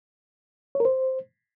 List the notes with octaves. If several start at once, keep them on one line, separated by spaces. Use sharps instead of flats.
C#5
A#4
C5